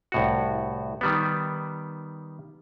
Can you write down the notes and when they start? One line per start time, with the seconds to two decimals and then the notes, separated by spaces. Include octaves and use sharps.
0.12 C2 A2 F#4
1.01 D#3 G3 B3